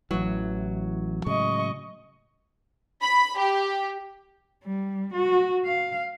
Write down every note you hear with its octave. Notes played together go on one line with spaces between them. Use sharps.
A1 E3 F#3
A2 C#3 G#3 D#5 C#6
B5
G4
G3
F#4
F5